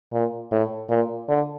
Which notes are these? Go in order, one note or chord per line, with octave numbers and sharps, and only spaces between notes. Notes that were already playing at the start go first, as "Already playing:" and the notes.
A#2
A2
A#2
D3